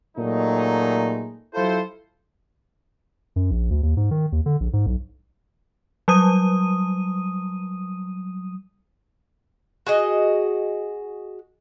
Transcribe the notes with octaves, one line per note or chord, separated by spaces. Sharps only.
A#2 F#3 G#3 A3 D#4
F#3 E4 F4 A4 C5
F#2
A#1
D2
D#2
G#2
D#3
D#2
D3
A#1
G#2
B1
F#3 G3 D#6 D#7
F#4 G#4 D#5